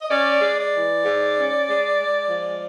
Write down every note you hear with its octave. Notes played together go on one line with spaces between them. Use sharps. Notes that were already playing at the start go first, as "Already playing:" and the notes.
D#5
C#4 D5
G#3
D5
E3
G#2
C#4
G#3
G#3
F3